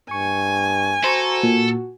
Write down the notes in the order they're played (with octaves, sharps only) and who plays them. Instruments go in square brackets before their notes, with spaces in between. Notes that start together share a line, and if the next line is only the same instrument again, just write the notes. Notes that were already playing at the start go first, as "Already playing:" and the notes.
[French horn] G2 [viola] G#5 [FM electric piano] C#6
[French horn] F#4 [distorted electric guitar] A4 [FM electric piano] C5 A#5 C#6
[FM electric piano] A#2